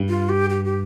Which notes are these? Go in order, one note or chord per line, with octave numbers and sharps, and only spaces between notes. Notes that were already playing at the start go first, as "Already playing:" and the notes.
Already playing: G2
F4
G4
G4
G4